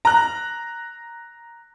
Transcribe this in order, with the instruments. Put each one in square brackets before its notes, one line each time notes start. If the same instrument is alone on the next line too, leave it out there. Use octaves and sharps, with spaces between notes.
[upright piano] A#5 F#6